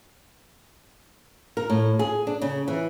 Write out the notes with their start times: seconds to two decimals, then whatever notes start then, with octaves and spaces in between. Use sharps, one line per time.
1.57 A#4
1.70 A2
1.99 G#4
2.27 D4
2.42 C#3
2.68 E3